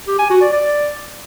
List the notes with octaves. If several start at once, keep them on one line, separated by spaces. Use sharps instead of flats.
G4
G#5
F#4
D5
D5